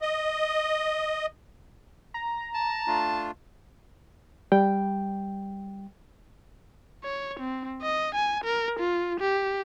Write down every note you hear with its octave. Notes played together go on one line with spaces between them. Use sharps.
D#5
A#5
A5
A3 D4 F4
G3 G5
C#5
C4
D#5
G#5
A#4
F4
G4